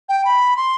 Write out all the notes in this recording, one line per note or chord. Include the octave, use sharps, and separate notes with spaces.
G5
B5
C6